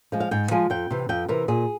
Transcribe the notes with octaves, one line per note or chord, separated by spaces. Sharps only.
F3 G#3
F5
G#2 G5
F3 G#3 G#5
F2 G5
C3 E3
F2 G5
C3 E3 A#4
A#2 G#4